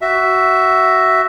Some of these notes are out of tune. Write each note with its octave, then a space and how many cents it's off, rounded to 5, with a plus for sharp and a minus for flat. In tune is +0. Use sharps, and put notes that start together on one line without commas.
F#4 +15 E5 +0